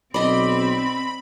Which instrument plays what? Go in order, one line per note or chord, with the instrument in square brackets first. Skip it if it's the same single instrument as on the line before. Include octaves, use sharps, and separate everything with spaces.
[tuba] B1 [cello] C4 [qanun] D5 D#5 [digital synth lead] B5